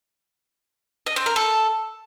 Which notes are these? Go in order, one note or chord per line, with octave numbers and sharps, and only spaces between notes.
D#5
C4
A#4
A4